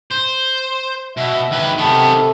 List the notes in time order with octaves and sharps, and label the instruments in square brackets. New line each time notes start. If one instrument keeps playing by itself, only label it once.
[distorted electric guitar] C5
[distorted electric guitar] B2 [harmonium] E5
[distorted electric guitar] D#2 B4
[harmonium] C3 A4 [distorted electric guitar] D#3 B3